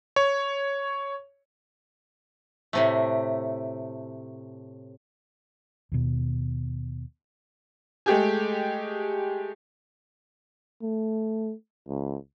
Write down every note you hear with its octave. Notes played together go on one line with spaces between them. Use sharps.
C#5
A2 C3 A3
D#2 B2
G#3 A3 G4 G#4
A3
C#2